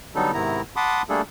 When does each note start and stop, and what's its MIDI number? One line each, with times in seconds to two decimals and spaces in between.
0.15 0.32 50
0.15 0.32 54
0.15 0.32 55
0.15 0.32 59
0.15 0.32 63
0.15 0.32 69
0.33 0.62 44
0.33 0.62 48
0.33 0.62 51
0.33 0.62 59
0.33 0.62 64
0.33 0.62 82
0.76 1.02 78
0.76 1.02 81
0.76 1.02 83
0.76 1.02 84
0.76 1.02 86
0.76 1.02 87
1.09 1.22 55
1.09 1.22 57
1.09 1.22 58
1.09 1.22 62
1.09 1.22 68
1.09 1.22 69